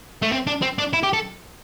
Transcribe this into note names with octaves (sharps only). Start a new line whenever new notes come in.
A3
C4
D4
C4
D4
E4
G4
A4